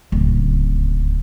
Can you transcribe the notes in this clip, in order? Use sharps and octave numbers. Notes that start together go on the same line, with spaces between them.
D1 C#2